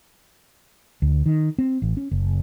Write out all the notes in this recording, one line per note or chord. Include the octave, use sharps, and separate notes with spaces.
D2
D#3
C4
A1
C#4
F#1